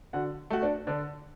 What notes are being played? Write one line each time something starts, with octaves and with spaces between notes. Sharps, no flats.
D3 F#4 F#5
A3 F#4
D4 D5
D3 D4 D5